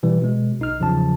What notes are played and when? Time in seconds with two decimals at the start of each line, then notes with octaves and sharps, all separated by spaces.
0.03 B2 E3 G3
0.22 B2 G#3
0.59 B1 D#4 F6
0.80 E2 C#3 F3 F#3 A5